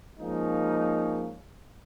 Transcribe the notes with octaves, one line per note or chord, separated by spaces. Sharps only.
F3 G#3 A#3 C#4 D#4